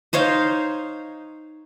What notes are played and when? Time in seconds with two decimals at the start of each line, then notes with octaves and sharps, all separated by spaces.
0.13 D#4 C5 C#5 F5